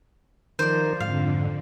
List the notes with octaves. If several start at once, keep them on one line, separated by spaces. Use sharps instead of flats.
D#3 F3 A#4 C5 D5
F2 G#2 D3 F5